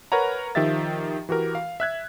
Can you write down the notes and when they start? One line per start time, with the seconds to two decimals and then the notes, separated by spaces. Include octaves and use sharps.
0.12 A#4 B4 C#5 F#5 A#5
0.55 D#3 F3 G4 E5 A6
1.29 E3 F#4 G4 A#4
1.55 F5
1.80 E5 F#6 G#6